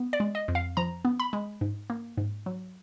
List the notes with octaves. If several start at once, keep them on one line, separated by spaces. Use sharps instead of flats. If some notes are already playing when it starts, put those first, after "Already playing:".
Already playing: B3
D5
G#3
D#5
F2
F5
F3 A#5
B3
B5
G#3
G#2
A#3
G#2
F#3